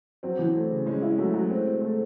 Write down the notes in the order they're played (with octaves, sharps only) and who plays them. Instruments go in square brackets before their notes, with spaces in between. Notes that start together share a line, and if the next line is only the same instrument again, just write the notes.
[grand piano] F#3 [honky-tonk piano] C4
[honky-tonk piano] E3
A3
C#3
[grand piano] G#3 [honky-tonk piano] C#4
[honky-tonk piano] E4
[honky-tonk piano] F#3 [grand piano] A3
[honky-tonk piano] F#3
C4
C4
A3